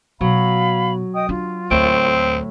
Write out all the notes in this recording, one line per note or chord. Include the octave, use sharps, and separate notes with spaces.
B2 F#3 F5 B5
D#5 G5 D#6
D4 F4
D2 A2 C4